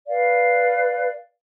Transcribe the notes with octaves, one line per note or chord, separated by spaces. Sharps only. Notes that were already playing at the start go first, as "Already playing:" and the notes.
B4 D5 F5